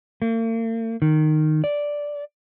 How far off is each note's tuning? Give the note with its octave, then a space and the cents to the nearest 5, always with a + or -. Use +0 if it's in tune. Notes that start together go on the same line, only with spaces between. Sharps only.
A#3 -45
D#3 -10
D5 -5